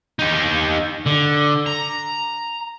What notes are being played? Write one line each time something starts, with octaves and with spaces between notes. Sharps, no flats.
D#4 G4
D3
A#5